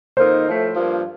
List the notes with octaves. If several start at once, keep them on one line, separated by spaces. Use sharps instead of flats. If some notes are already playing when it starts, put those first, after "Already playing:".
F2 D#3 A#3 D#4 A#4 C5
A2 F3 A3
G2 F3 A#3